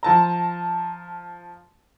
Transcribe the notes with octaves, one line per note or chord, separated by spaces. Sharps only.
F3 A5 A#5